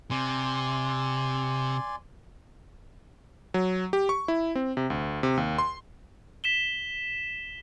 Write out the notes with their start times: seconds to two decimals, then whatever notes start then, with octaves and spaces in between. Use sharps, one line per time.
0.11 C3 D5 G#5 C6
3.54 F#3
3.93 G4
4.09 C#6
4.28 E4
4.55 C4
4.77 C3
4.90 D2
5.23 C3
5.37 D#2
5.58 C6
6.44 B6 E7 G7